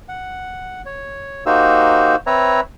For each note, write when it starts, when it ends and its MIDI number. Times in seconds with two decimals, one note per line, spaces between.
0.09 0.82 78
0.86 1.44 73
1.46 2.16 58
1.46 2.16 63
1.46 2.16 66
1.46 2.16 67
1.46 2.16 72
1.46 2.16 88
2.27 2.60 60
2.27 2.60 71
2.27 2.60 73
2.27 2.60 76
2.27 2.60 82